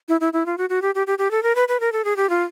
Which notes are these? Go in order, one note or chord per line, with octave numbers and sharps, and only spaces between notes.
E4
E4
E4
F4
F#4
F#4
G4
G4
G4
G4
A4
A#4
B4
B4
A#4
A4
G#4
G4
F4